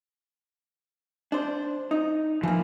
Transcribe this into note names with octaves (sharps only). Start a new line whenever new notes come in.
D4 C5
D#4
E3 F3 A#3